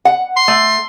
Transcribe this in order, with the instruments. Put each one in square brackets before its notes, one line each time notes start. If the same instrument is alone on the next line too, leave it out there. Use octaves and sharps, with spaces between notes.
[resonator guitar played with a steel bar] F#5
[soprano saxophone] C6
[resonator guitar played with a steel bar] A3